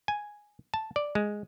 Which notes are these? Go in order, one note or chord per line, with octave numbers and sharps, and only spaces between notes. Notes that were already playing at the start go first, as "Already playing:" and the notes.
G#5
A5
D5
G#3